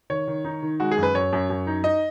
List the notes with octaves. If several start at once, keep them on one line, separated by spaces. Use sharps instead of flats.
D#3 C#5
D#3
D#4
D#3
G#3 F#4
G#4
F#2
B4
F#2 C#5
F#2
F#2
D#4
D#4 D#5